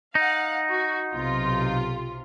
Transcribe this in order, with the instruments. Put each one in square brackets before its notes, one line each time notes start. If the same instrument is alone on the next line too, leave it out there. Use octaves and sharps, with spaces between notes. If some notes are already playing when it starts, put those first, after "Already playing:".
[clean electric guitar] D#4 [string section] F5 F#5
[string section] F#4
B1 C3 F4